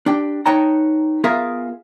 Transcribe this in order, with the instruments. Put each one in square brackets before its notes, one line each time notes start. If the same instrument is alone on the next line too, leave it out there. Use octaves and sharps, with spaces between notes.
[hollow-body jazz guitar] D4 G4 G5
D#4 B4 C#5 G5 A5 A#5
B3 F4 G#4 A#4 E5 F5